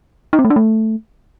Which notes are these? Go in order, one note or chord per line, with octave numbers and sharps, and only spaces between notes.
D#4
C4
A3
D4
A3